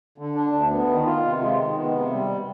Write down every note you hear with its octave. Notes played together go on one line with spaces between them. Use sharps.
D3
D4
D2
B3
D#3
F4
C3
G#3
D#3
B3
C3
G3